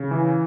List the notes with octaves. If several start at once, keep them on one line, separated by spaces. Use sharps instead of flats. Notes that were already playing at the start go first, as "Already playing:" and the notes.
Already playing: C#3
E3